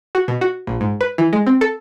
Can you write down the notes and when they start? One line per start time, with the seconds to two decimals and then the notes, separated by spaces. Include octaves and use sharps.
0.15 F#4
0.28 B2
0.41 F#4
0.67 A#1
0.81 G#2
1.01 B4
1.18 E3
1.33 G#3
1.46 C4
1.61 A4